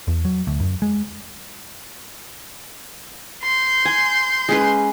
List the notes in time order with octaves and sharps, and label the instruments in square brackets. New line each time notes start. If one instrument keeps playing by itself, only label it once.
[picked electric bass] E2
F#3
D2
F#2
G#3
[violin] C6 G6
[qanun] G#5
G#3 C#4 B4